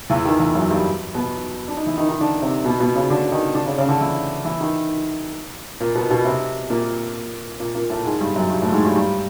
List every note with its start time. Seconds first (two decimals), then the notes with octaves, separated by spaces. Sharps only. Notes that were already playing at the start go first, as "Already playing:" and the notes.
0.10 E2 E3
0.25 D#3
0.40 E2 E3
0.55 F#2 F#3
0.70 G2 G3
1.15 B2 B3
1.68 D4
1.77 D#4
1.86 E3 E4
1.98 D#3 D#4
2.08 D#3 D#4
2.20 D3 D4
2.42 C3 C4
2.65 B2 B3
2.80 B2 B3
2.96 C#3 C#4
3.10 D3 D4
3.32 D#3 D#4
3.55 D3 D4
3.66 C#3 C#4
3.78 C#3 C#4
3.89 D3 D4
4.01 E3 E4
4.45 E3 E4
4.60 D#3 D#4
5.80 A#2 A#3
5.95 B2 B3
6.10 B2 B3
6.25 C3 C4
6.70 A#2 A#3
7.60 A#2 A#3
7.75 A#2 A#3
7.90 A2 A3
8.05 G#2 G#3
8.21 G2 G3
8.35 F#2 F#3
8.50 G2 G3
8.62 A2 A3
8.72 G#2 G#3
8.85 G2 G3
8.96 G2 G3